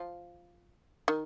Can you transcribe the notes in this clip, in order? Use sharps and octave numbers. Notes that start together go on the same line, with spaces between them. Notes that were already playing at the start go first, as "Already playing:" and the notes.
Already playing: F3
D#3